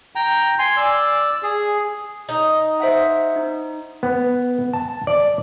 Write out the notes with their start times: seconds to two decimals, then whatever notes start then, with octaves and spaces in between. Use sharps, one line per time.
0.15 G5 A#5
0.59 G#5 C6
0.77 D5 E6
1.43 G#4
2.29 D#4
2.80 C5 E5 F#5
3.36 D#4
4.03 B3
4.73 A5
5.07 D5